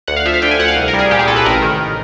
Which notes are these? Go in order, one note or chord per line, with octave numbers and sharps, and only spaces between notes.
D2 F#5
F5
F3 E5
F5
D3 G5
G#5
D2 F#5
F5
C2
A#4
G3
G#4
A#2 G4
G#4
C2 A4
B4
A1 A#4
D#3